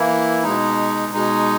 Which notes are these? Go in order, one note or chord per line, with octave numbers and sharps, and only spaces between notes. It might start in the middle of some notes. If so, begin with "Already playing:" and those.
Already playing: E3 A#3 E4
B2 G#3 D#4
B2 G#3 D#4